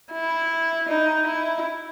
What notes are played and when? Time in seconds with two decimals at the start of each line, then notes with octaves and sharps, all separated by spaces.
0.12 E4
0.89 D#4
1.27 E4